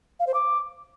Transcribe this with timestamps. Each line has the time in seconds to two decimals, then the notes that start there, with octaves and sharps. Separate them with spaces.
0.20 F5
0.27 C5
0.34 D6